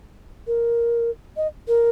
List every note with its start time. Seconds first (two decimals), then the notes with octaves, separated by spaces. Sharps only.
0.47 A#4
1.37 D#5
1.68 A#4